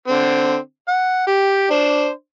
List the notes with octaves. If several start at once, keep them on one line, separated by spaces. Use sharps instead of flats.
D3 C4
F#5
G4
D4 C5